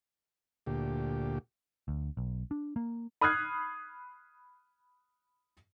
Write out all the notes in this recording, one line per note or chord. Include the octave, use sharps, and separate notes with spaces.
D2 A#2 G4
D2
B1
D4
A#3
B5 D#6 F6 F#6 G#6 C7